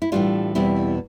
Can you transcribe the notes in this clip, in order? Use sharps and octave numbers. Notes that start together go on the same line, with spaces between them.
E4
A2 E3 G3 D4 F4
E2 B2 G3 C4 E4